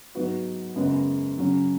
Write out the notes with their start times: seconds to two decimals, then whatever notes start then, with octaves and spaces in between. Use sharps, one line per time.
0.15 G#2 F#3 B3 F#4 B4
0.76 F#2 C#3 G#3 B3
1.38 C#3 F#3 C#4